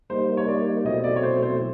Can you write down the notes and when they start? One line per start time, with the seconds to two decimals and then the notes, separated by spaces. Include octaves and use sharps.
0.10 G3 A#3 D#4 C5
0.37 C#5
0.48 D5
0.85 B2 F#3 A3 C4 E4 D#5
1.04 D5
1.16 C#5
1.23 C5
1.42 C5